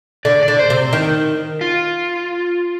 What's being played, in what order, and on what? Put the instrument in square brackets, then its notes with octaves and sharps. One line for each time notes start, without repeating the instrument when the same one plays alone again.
[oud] D3 [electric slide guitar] D5
[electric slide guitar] D5
[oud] D3
[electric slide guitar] C5
[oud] C3
D#3
[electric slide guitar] F4